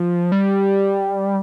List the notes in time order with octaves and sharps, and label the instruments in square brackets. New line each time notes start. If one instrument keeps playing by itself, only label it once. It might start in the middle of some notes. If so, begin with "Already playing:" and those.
Already playing: [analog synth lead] F3
G3